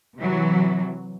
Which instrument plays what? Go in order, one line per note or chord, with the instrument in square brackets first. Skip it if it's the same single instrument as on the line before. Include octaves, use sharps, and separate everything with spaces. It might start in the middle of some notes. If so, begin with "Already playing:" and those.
[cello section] C3 E3 F#3